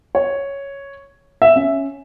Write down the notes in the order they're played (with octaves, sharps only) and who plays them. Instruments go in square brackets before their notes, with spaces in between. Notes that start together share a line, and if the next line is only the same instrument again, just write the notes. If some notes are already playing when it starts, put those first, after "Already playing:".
[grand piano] C#5
E5
C#4